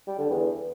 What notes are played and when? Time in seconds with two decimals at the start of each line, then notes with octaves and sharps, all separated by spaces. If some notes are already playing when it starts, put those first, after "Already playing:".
0.07 G3
0.18 D3
0.30 E2